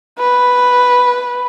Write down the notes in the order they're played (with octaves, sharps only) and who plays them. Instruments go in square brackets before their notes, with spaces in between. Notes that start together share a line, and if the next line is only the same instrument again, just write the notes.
[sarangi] B4